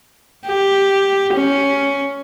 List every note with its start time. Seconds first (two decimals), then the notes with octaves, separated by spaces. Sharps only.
0.47 G4
1.34 C#4